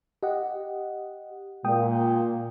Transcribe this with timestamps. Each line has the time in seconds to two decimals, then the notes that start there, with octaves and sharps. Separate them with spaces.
0.23 G4 D#5 F#5
1.64 A#2 G#3 G5 D#6